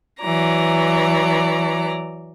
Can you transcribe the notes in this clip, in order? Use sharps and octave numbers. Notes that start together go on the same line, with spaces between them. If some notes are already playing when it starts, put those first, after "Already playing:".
E3 F#3 D5 A#5